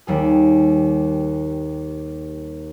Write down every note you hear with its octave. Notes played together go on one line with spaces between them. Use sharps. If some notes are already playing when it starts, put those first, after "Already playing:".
D#2 G3 G#4